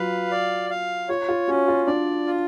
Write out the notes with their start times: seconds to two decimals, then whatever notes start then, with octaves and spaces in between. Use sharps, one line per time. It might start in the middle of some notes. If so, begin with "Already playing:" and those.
Already playing: F#3 F4 B4 F5
0.31 D5
0.70 F5
1.09 F4 C#5
1.29 F4
1.48 C#4 F#4
1.68 F4
1.87 D4 D5
2.26 F4